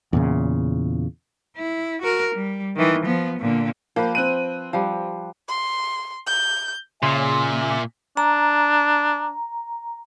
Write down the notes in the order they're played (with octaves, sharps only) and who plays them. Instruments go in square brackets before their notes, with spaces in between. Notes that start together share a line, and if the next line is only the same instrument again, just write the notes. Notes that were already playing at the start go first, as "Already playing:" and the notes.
[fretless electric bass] E2 A#2 C#3
[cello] E4
F#4 A#4
G3
D#3 E3
F3 B3
A#2 D3
[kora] F3 B4 G5 [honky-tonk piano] A#3
[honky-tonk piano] C4 F#6 D#7
[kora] F3 G3
[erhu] C6
G6
[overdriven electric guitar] A#2 [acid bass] C#3 [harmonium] E5 G#5 [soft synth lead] C6
[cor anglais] D4 [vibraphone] A#5